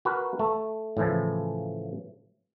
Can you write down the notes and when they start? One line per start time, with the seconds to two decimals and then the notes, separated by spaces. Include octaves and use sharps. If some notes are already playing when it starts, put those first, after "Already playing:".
0.05 F#4 A#4 B4
0.39 A3
0.97 A2 C#3 E3 F3